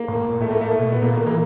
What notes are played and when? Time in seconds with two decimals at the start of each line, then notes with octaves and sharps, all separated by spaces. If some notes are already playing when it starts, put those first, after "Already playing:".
Already playing: A#3
0.08 A2
0.25 A#2
0.40 A2 A3
0.51 A#3
0.61 A3
0.79 B2
0.90 A#2 B3
1.02 A#2 A#3
1.14 D#3
1.27 E3 A#3